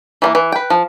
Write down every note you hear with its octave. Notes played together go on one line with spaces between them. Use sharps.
E3 G3 A#3
E3
B4 G5
F3